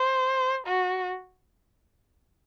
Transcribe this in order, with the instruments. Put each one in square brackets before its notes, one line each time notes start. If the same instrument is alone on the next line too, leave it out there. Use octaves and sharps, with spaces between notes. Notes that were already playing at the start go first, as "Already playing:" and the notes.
Already playing: [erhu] C5
F#4